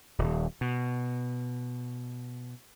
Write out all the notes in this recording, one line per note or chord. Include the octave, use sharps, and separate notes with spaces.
D#1
B2